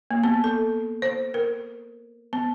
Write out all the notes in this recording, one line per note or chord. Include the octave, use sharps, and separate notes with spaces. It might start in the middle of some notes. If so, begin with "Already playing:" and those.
A#3
B3
A4
C5
A#4
B3